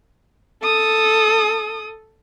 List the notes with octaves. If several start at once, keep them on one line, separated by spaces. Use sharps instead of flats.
A4 D#6